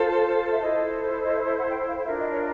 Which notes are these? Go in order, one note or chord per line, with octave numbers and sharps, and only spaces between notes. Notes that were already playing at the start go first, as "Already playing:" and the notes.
Already playing: F4 A4 C5
E5
E4 A4 C5 D#5
D#5
E5
E5
F#5
G5
F5
D4 F4 A#4 E5
D#5
C#5